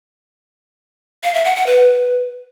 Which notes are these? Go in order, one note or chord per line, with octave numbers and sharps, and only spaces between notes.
F5
E5
F#5
F#5
B4